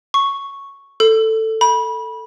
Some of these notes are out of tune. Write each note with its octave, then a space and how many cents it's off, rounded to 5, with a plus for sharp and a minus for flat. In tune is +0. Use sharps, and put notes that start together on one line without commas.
C#6 +0
A4 +10
B5 -25